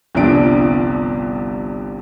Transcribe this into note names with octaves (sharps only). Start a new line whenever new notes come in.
G1 C2 C3 F3 D4 D7